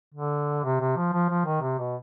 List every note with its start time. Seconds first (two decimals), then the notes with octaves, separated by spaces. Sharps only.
0.14 D3
0.64 C3
0.80 C3
0.97 F3
1.13 F3
1.29 F3
1.46 D#3
1.62 C3
1.79 B2